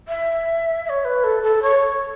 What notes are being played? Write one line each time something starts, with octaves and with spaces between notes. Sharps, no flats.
E5
E5
C#5
B4
A4
A4
C#5